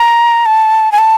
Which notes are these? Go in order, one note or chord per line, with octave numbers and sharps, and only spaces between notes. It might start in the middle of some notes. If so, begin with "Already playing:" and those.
Already playing: A#5
A5
G#5
A5